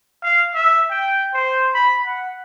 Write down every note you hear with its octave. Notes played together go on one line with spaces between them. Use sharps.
F5
E5
G5
C5
B5
F#5